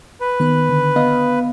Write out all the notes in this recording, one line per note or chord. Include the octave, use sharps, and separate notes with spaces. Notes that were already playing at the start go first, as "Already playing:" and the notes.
B4
D#3 B3 F#6
D3
B3 D#5 F5